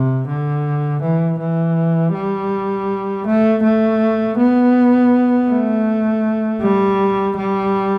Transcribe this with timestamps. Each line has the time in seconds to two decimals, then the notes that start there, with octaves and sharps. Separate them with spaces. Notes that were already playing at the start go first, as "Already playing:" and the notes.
Already playing: C3
0.27 D3
1.01 E3
1.39 E3
2.13 G3
3.26 A3
3.63 A3
4.38 B3
5.49 A3
6.61 G3
7.36 G3